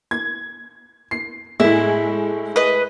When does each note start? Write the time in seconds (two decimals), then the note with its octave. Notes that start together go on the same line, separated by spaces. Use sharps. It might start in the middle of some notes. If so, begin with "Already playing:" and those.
0.11 G#6
1.11 C7
1.60 A2 G#3 E4
2.56 B4 D#5